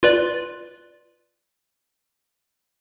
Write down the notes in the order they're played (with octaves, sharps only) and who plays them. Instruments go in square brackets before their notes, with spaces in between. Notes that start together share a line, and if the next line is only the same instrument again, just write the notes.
[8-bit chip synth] F4 B4 D5